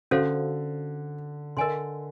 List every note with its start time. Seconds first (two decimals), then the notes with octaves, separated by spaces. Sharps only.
0.11 D3 C#4 F#4 A4 C5 F5
1.57 D3 A#4 D#5 G#5 C6